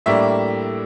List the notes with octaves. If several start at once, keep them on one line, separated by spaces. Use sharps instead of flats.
A2 G3 A#3 D4 E5